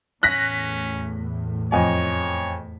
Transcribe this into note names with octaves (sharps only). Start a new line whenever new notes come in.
E2 A2 C#4 F#6 A#6 B6
F2 C#5 D#5 G#5